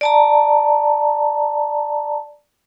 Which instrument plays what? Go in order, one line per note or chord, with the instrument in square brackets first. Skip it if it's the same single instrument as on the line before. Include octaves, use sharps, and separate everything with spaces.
[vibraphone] D5 A5 A#5